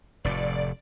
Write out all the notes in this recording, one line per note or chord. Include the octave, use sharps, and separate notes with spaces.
F1 A2 D5